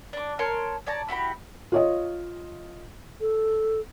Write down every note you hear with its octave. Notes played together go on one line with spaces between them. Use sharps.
D4 D6
A#4 C#5 A5 C6
C#5 D5 A5 A#5
E4 F#4 G4 B5
F4 C#5 D#5
A4